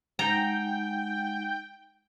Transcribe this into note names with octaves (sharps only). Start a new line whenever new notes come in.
G#3 D#4 F#5 G5 A#5